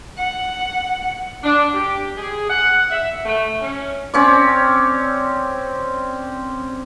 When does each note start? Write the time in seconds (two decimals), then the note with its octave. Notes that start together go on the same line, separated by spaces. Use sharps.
0.18 F#5
1.43 D4
1.74 G4
2.15 G#4
2.48 F#5
2.90 E5
3.25 A3
3.59 C#4
4.14 C4 C#4 D5